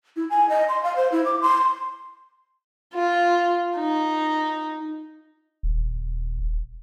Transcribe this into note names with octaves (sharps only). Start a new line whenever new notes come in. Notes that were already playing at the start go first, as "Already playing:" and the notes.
E4
G#5
D#5
C6
F5
C5
E4
D6
C6
F4
D#4
D#1